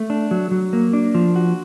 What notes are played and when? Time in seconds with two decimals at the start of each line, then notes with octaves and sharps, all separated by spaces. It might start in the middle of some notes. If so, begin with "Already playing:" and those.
Already playing: A3
0.10 D4
0.31 F#3
0.51 F#3
0.73 A#3
0.93 D4
1.15 F3
1.36 F#4